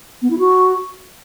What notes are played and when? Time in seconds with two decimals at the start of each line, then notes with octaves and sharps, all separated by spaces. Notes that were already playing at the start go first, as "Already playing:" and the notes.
0.22 B3
0.30 E4
0.39 F#4